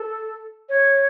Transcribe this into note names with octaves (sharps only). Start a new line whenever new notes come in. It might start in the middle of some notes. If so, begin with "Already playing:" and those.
Already playing: A4
C#5